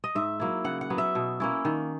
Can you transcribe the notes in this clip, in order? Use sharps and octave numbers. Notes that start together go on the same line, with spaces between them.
D#5
G#2 E5
F#3 A#3 E4
C#3 F#5
F#5
F#3 B3
E5
B2
A#3 C#4 E4
D#3